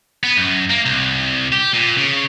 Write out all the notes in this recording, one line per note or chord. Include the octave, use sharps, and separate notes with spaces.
B3
F#2
A#3
C2
G4
A#2
C#3